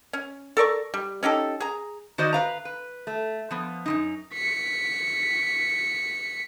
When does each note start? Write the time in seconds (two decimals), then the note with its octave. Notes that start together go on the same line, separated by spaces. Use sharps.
0.13 C#4
0.57 A4 A#4 D5 C#6
0.94 G3
1.23 C#4 D#4 G4 A4
1.60 G#4 A#5
2.18 D#3 F#4 C5 D5 D#5
2.33 B4 F5 A#5
2.65 B4
3.07 A3
3.51 F3 B3
3.86 F#2 E3 D#4
4.34 B6 C#7